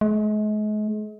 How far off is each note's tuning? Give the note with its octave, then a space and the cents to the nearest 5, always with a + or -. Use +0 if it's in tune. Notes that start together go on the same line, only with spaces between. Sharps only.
G#3 +40